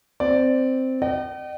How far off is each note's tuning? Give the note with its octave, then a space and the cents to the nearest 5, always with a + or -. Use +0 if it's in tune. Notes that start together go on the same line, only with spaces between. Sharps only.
C4 -5 D5 +0
D#5 -45 G5 -45